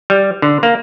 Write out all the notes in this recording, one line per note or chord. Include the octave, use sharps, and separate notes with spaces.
G3
D3
A#3